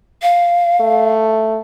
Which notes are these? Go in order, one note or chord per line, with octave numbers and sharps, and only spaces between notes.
F5
A3